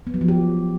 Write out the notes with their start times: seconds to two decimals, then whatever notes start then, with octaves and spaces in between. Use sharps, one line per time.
0.07 B3
0.14 F#3
0.21 F3
0.28 G4